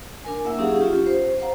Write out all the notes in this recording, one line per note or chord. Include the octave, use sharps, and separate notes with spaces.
D4 A#4 G#5
A#3 E4 E5 F#5 E6
F#3 C#4 D#4 G4 G#4 F5
C#4 F4 G4
C5
C5 F5 F#5 A#5